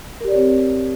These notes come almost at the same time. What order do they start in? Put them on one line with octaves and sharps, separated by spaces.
A#4 G4 D5 C#5 C4